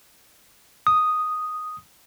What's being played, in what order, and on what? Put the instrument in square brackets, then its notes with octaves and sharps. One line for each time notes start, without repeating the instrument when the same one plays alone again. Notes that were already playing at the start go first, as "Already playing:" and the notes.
[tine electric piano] D#6